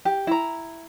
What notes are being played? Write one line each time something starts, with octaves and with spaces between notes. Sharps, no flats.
G4
E4 A#5